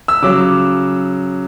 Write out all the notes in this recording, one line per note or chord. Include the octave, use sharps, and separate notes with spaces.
E6
C#3 F#3 D6